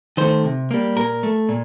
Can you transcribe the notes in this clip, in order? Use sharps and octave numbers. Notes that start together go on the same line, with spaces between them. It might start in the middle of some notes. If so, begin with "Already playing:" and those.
D#3 A3 C5
C3
G3 A#3
A#2 A#4
A3
A#2